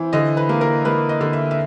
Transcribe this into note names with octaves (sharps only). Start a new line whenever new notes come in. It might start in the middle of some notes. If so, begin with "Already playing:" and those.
Already playing: E3 C4
D3 D#5
B4
A#3
A#4
A#3 B4
D#5
D3
E5
E5